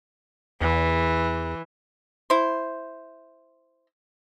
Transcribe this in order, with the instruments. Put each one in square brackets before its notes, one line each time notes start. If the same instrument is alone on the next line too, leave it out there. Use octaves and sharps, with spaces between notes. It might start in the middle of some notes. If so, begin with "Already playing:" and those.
[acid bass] E2 [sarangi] E3
[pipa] E4 C5